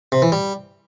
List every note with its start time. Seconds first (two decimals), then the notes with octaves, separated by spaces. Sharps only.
0.12 C3
0.22 E3
0.32 G3